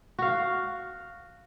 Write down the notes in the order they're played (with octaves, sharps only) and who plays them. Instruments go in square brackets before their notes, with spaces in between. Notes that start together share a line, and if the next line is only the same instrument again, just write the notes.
[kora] F#4 F5